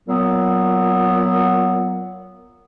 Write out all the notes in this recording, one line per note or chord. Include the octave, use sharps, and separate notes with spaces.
A#2 F#3 B3